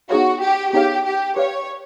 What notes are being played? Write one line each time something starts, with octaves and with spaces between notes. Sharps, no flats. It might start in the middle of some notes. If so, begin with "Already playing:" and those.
B3 D#4 F#4 G#4 C#5 F5
G4
B3 D#4 G4 G#4 C#5 F5
G4
G4 B4 C#5 D5 F5